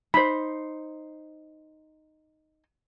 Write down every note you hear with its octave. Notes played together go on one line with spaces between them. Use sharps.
D#4 C5 B5